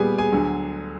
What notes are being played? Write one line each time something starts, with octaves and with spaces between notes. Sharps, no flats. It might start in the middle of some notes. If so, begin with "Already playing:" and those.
Already playing: A#2 G3 B3 G4 G#4 G#5
G#4 G#5
D2 D3 F#3